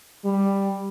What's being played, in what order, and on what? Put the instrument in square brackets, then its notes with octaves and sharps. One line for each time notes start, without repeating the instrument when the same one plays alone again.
[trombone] G3